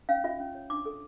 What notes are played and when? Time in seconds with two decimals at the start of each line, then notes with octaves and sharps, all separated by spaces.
0.09 C#4 F5
0.24 F4 E5
0.40 C#4
0.55 C#5
0.70 D4 D6
0.86 A4